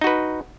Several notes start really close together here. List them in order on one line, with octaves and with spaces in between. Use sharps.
D#4 F#4 B4